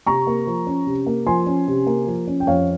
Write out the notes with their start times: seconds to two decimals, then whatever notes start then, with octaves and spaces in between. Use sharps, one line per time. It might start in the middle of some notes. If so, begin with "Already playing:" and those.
0.06 C3 A#5 C#6
0.27 A#3
0.47 F3
0.67 C#4
0.87 C3
1.07 A#3
1.27 F3 G#5 C6
1.47 C#4
1.68 C3
1.87 A#3
2.07 F3
2.27 C#4
2.40 G5
2.47 F2 C#5 F5